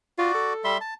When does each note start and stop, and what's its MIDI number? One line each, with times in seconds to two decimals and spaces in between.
0.19 0.33 65
0.19 0.53 66
0.19 0.53 74
0.34 0.75 69
0.64 0.78 55
0.64 0.78 76
0.64 0.78 84
0.81 0.94 81